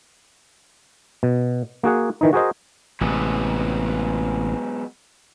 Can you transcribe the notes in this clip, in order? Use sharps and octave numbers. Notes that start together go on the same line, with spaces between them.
B2
A#3 F#4 G#4 F#5
D#3 E3 D#4
F#4 G#4 A#4 C5 D#5
A1 C3 F#3 G#3 B3